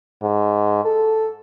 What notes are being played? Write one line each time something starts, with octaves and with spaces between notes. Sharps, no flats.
G#2
A4